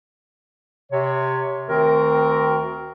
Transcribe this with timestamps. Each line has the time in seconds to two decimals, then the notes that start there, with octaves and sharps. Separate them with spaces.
0.92 C3 C#5
1.69 D2 D#3 C4 F#4 A#4